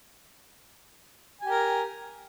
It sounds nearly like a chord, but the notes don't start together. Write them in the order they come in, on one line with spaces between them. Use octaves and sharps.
G#5 G4 A#4